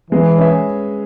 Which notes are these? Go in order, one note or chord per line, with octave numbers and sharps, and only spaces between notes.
E3 G#3
C#4 G#4 B4 E5